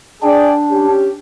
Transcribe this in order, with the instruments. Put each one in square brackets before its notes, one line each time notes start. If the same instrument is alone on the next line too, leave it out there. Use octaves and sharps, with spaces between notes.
[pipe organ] D4 [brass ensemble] G#4 D5 G5
[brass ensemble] C#4 G4